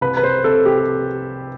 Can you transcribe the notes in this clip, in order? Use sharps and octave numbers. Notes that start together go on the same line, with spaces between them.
C2 B4
B4
C5
C3 A4
G4